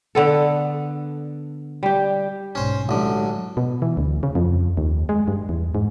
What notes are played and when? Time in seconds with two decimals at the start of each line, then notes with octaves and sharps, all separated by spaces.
0.15 D3 B3 A4
1.83 G3 G4
2.55 B1 G#2 C#4 C5
2.89 A1 D3 F#3 G#3
3.57 B2
3.82 E3
3.97 D2
4.23 C#3
4.35 F2
4.77 D#2
5.09 G#3
5.28 G2
5.49 E2
5.75 G#2